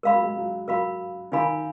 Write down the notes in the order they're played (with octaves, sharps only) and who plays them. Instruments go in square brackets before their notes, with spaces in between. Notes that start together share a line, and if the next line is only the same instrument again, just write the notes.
[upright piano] G#3 [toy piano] A#4 F5 B5
[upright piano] F#3
G#3
F#3
[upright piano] F#3 [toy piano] A#4 F5 B5
[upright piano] D#3 [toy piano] D#4 A#4 F5 G#5 B5